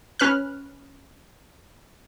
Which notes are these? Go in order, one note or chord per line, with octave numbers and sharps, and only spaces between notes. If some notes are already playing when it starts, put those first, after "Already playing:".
C#4 B4 F6 F#6